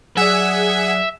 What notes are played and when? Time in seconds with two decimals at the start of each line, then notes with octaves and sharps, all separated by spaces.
0.17 F#3 G#4 D5 E5 F#5 G#5